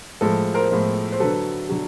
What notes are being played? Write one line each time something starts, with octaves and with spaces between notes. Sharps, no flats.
A2 F3 G#3 A4
A#4 C5
A2 F3 G#3
C5
D3 F#3 A4 B4
D3 F#3